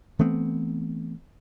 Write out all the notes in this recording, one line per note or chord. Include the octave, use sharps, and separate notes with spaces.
E3 A3 B3 C4